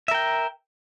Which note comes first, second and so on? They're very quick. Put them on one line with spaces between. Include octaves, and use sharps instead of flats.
E5 A#4 G5